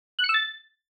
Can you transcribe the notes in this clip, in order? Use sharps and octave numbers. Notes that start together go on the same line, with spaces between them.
F#6
C#7
E6
A6